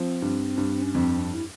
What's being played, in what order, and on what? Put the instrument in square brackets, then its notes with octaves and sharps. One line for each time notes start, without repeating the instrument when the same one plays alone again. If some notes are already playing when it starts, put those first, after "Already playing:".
Already playing: [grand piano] F3 [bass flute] C4
[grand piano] G2
G2
[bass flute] C#4
[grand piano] F2 [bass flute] C4
[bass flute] D4
E4